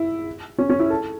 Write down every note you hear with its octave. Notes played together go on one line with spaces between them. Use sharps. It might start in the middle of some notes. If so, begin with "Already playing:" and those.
Already playing: E4
C#4
C#4
E4
A4